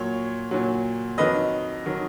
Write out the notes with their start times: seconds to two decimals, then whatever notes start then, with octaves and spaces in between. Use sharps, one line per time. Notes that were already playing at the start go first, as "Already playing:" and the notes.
Already playing: A#2 F#3 C#5
0.51 A#2 F#3
1.18 F2 D#3 F#3 B4 D#5
1.86 D#3 F#3